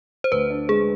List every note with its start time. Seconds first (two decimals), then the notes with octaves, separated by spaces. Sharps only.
0.24 C5
0.32 D2 B4
0.50 D4
0.69 G#3 G#4